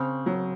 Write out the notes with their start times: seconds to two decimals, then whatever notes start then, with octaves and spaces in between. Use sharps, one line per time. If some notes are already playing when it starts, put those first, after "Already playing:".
Already playing: C#3 C4
0.26 F#3